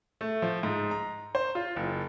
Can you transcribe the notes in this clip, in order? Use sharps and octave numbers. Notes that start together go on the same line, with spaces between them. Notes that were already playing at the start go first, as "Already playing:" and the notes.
A3
F3
G#2
A#5
C5
F4
F#1